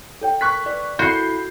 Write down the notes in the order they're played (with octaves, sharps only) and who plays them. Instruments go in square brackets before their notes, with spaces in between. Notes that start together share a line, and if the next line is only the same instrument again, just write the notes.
[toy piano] A4 C#5 G5
[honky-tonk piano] C#6 F#6 B6
[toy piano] B4 [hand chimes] D5
[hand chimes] E4 A4 B5 [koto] F#4 [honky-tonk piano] G6 C7